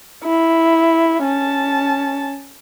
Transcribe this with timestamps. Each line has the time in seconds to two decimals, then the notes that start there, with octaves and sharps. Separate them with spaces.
0.24 E4
1.24 C#4 A5